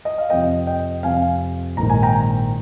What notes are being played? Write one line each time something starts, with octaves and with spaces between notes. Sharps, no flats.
D#5
F5
F2 C3 F3 C4 D#5 G5
D#5 G5
F2 C3 F3 C4 F5 G#5
A#1 G#2 D#3 A#5
G#5
G5 A#5